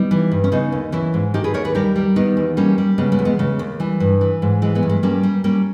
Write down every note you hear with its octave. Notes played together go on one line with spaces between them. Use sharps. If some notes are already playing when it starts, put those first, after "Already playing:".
Already playing: G3 B3 D#4
E3
G2
C#4
C#3 B3 D#4
D#2
E3 C#4 E4
G#2
D#3 D#4 G4
G#4 B4
D#2 A#4 C#5
G#4 B4
G3 G4 A#4
G3
D#3 B3 D#4
E2
G3 A#3 C#4
G3
C#3 G#3 B3
G#3 B3
E2
G#3 B3
C#3 G#3
D#2
E3 G3
G2
E3
G#2
E3 G#3
G#3 B3
G2
G#3
G3 A#3 C#4
G3
G3 A#3 C#4